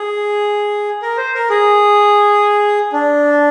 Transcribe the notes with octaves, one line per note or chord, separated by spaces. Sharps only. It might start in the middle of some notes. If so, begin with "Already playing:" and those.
Already playing: G#4
A#4
C5
A#4
G#4
D4